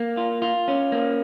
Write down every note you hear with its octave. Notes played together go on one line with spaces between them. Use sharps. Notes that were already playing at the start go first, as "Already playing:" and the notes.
Already playing: A#3
F4
F4
C#4
A#3